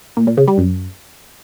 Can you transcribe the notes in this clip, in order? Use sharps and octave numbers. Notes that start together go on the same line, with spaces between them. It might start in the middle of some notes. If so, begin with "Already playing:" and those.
A#2
A#2
C#3
G3
F#2